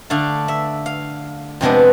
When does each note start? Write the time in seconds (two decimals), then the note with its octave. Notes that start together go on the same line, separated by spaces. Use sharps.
0.10 D3 A3 D4 F5
0.48 E5
0.86 F5
1.61 F2 C3 G#3 B3 D4